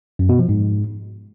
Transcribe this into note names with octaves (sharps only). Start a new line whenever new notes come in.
F#2
B2
F3
G#2